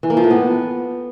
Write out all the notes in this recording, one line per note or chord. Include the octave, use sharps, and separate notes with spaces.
E3
A#3
F3
A2
B3